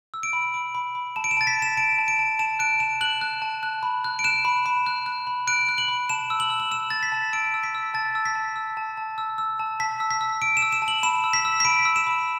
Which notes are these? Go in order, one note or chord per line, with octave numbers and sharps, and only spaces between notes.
E6
D7
B5
B5
B5
B5
A5 E7
D7
E7
A5 A6
B6
A5
E7
A5 D7
A5
D7
A5
A5 E7
F#6 D7
A5 E7
F#6 F#7
F#6
A5
F#6
B5
F#6
D7
F#6 E7
B5
B5
F#6
F#6
B5
F#6 D7
F#6
F#7
B5
A5 E7
E6
F#7
E6
F#7
E6 E7
E6 A6
B6
A5
E6 D7
E6
B6
E6
A5 A6
E6
B6
A5
E6
A5
A5
E6
E6
A5
A5 B6
E6
B6
E6
E6 D7
E7
E6
E7
A5
F#7
B5 E7
E6
B6
E6
B6
B5 D7
E6
E7
B5